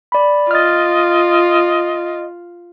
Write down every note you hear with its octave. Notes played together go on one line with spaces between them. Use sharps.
D5 B5
F4 D#5 F6 A6